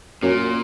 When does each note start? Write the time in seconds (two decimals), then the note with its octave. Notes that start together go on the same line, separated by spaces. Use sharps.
0.23 F#2 A#2